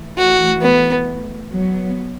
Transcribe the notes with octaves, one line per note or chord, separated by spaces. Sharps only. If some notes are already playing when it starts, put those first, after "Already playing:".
Already playing: E3 A3
F#4
B3
F#3 B3